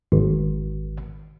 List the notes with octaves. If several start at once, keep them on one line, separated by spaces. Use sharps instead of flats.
G#1